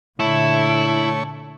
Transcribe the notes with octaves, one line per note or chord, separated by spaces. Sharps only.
A#2 D3 A3 E4 C#5